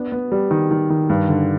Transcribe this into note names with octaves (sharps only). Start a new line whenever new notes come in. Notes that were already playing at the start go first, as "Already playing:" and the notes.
Already playing: B3 D4
B3
G3
D#3
D#3
D#3
G2
D3